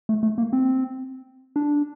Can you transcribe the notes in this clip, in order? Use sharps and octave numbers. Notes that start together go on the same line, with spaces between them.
A3
A3
A#3
C4
D4